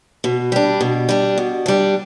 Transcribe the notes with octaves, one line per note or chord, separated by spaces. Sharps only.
B2
G3 D4
B2
G3 D4
B2
G3 D4